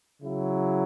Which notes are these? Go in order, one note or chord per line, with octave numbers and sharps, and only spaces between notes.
C#3 F#3 E4